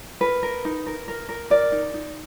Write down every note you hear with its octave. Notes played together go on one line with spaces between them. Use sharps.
A#4 B4
A#4
D#4
A#4
A#4
A#4
A#4 D5
D#4
D#4